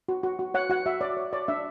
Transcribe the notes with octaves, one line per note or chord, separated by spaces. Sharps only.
F#4
F#4
F#4
C#5 F#5
F#4 F#5
F#4 E5
C#5 D5
C#5
C#5 D5
D4 E5